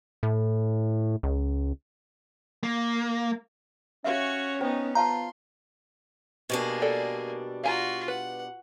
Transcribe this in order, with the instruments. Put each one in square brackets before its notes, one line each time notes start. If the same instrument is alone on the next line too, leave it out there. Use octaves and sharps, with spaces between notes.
[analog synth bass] A2
C#2
[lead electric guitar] A#3
[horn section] C#4 [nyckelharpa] F#4 C#5 [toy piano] E5 F5
[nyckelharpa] B3 D#4 [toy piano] C5 G5
[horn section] B3 F4 [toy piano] C#5 F5 A5 [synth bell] A#5 [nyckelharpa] C6
[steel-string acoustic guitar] B2 G3 D4 [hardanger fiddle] A#3 G#4
[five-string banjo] A4 D5 G5
[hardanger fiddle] F4 F#4 [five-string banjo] F5 G#5 A#5
[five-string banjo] B4 [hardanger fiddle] F#5